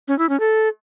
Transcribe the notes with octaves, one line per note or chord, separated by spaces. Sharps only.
C#4
E4
C#4
A4